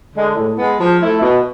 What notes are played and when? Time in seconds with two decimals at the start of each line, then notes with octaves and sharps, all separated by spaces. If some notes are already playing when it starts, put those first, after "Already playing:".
0.14 D3 G#3
0.35 A2
0.57 G#3 B3
0.79 F3
1.00 A3 E4 A4
1.21 B2